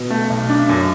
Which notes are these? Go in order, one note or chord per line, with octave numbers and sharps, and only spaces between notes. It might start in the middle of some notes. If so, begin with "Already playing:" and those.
Already playing: B2
A3
B1
D4
F#2